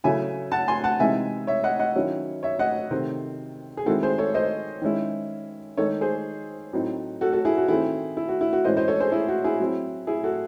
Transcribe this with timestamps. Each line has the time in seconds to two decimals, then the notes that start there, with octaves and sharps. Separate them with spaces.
0.04 C#3 F#3 A3 C#4 E4 E5 G#5
0.52 F#5 A5
0.68 G#5 C6
0.84 F#5 A5
1.00 C3 E3 G#3 D#4 E5 G#5
1.47 C#5 E5
1.63 D#5 F#5
1.79 D#5 F#5
1.95 D#3 F#3 C#4 E4
2.43 C#5 E5
2.59 D#5 F#5
2.91 C3 D#3 A3 C4
3.77 G#4
3.86 D#3 G#3 C4 E4 F#4 A4
4.03 G#4 C5
4.18 A4 C#5
4.34 C5 D#5
4.82 D#3 G#3 C#4 E4
5.77 D#3 G#3 D#4 A4 C#5
6.01 G#4 C5
6.73 A2 F#3 C4 D#4
7.21 F#4 A4
7.33 F#4 A4
7.45 E4 G#4
7.57 F#4
7.68 D#3 A3 C4 E4 G#4
8.17 E4
8.29 F#4
8.41 E4
8.53 F#4
8.64 A2 E3 G#3 C#4 C5 D#5
8.77 C5 D#5
8.88 A4 C#5
9.00 G#4 C5
9.12 E4 G#4
9.28 F#4
9.44 E4 G#4
9.60 F#3 C4 E4
10.07 E4 G#4
10.24 F#4 A4